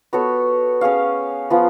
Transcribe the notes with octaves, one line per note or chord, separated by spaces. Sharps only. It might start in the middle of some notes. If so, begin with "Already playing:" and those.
B3 F#4 A4 C#5
C#4 G#4 C#5 F5
F3 B3 F4